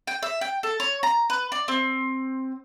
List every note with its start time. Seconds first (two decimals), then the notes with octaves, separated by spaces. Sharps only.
0.07 G5
0.23 E5
0.41 G5
0.63 A4
0.80 C#5
1.03 A#5
1.30 B4
1.52 D5
1.68 C4